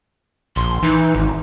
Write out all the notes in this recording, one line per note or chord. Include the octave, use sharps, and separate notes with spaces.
A#1 C6
E3 D#4
G#1